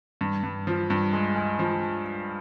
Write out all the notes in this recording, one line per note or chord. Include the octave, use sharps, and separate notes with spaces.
G2
G2
F3
G2
G#3
G#3
F3